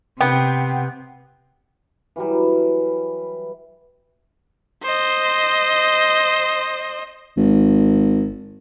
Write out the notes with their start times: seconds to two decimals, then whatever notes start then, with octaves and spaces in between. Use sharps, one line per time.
0.21 C3 B3 G5
2.16 E3 F#3 G3
4.84 C5 D#5
7.37 G#1